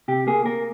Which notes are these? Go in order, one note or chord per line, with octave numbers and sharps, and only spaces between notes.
C3 G4
A#3 G#4
A#3 A#4